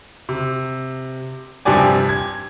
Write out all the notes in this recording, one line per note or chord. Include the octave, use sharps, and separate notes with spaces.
C3
G2 C3 F3 G4 D5 G#5
G#6